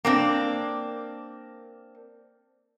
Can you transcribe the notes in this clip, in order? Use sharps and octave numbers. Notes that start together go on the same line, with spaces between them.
A#3 C4 D4